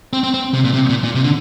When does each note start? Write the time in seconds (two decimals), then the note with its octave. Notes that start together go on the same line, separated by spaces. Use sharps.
0.13 C4
0.24 C4
0.34 C4
0.54 C3
0.64 A#2
0.74 C3
0.89 A#2
1.04 A#2
1.15 C3
1.24 D3